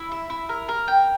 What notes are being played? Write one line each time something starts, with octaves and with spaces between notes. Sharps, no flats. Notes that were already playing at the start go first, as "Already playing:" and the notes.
Already playing: E4
E5
E4
A#4
A#4
G5